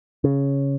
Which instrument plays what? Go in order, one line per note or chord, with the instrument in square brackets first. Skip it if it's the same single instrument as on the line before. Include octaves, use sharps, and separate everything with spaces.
[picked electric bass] C#3